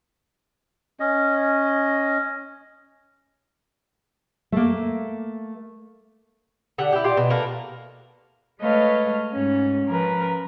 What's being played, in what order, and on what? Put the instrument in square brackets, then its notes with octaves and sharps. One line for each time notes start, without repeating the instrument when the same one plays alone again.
[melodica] C#4 D#5
[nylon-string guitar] A3 A#3
[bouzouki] D3 G4 F#5
E4 G4
A#2 F4 G4
B2
A3 A#3 A#4 B4
[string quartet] G#3 A3 B4 C#5 D#5 F5
G#2 C#4
F3 C#4 A#4 B4